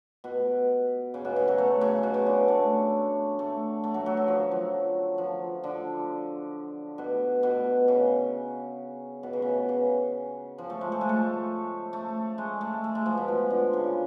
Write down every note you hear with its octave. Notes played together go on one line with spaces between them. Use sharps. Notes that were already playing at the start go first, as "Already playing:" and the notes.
B2
C#3
B2
C#3
F#3
A3
C#3
B2
C#3
D3
A3
A3
A3
F#3
F#3
F#3
F3
F#3
F3
D3
B2
B2
C#3
B2
C#3
B2
C#3
F3
A3
G#3
A3
G#3
A3
A3
G#3
A3
A3
G#3
F3
B2
F3
D3
C#3